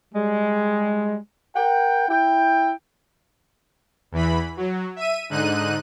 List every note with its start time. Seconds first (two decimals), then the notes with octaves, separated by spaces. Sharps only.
0.14 G3 G#3
1.55 A#4 F#5 G5
2.09 E4 G5
4.12 E2 E3 B5
4.57 F#3
4.96 E5 D#7
5.29 G#2 D3 D#4 F#6 D#7